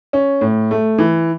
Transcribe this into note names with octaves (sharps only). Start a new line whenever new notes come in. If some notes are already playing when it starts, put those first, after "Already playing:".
C#4
A2
A3
E3